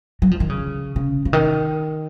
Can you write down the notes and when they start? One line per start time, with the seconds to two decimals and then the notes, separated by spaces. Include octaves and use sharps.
0.22 F#3
0.31 F3
0.40 D#3
0.49 C#3
0.96 C#3
1.25 C#3
1.33 D#3